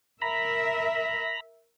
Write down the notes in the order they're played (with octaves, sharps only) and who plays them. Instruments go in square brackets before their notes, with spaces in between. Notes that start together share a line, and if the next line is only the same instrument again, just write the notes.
[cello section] A#4 E5 [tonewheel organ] A#5 B5